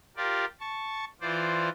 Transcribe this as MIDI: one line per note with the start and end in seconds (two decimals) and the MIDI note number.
0.16 0.45 65
0.16 0.45 67
0.16 0.45 70
0.16 0.45 74
0.60 1.05 81
0.60 1.05 85
1.21 1.69 52
1.21 1.69 65
1.21 1.69 72
1.21 1.69 74